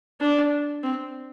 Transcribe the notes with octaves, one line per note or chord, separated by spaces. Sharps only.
D4
C4